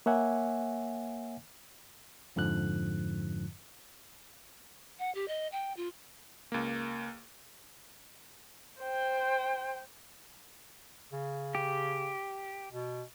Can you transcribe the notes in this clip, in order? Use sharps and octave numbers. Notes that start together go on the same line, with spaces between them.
A#3 C#5 E5 F#5 G#5
F2 G#2 D3 F3 F#6
F#5
G4
D#5
G5
F4
C#2 A#3
C5 G5
C#3
G4
B2